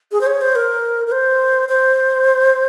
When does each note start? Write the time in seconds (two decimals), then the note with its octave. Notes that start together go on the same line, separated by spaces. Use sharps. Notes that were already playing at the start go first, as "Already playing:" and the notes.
0.12 G#4
0.21 C5
0.27 C#5
0.41 C5
0.55 A#4
1.07 A#4
1.12 C5
1.69 C5